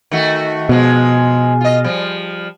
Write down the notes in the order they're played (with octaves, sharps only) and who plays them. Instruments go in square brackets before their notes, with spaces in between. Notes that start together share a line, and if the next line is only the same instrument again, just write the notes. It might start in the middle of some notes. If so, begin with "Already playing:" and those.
[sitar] D#3 A3 F#4
[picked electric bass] B2 [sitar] F3 G#3
[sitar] F4 D#5
F3 G3